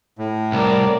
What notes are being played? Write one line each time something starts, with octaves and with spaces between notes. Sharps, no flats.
A2
C2 A#4 D5